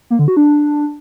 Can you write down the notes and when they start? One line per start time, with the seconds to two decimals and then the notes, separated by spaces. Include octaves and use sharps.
0.10 A#3
0.19 D3
0.28 F#4
0.37 D4